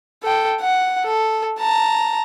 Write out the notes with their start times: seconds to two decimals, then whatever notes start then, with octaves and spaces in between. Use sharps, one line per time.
0.23 A4 G5
0.61 F#5
1.04 A4
1.58 A5 A#5